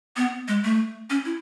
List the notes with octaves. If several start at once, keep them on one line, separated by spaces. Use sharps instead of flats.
B3
G#3
A3
C#4
E4